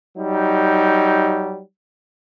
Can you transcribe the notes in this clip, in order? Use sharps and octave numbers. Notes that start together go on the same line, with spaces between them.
F#3 G3 D#4